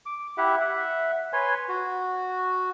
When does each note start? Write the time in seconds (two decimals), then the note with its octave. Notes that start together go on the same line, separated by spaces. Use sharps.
0.06 D6
0.38 E4 G4 E5 F#5
0.60 E5 F#5
1.33 B4 C#5 G#5 C6
1.69 F#4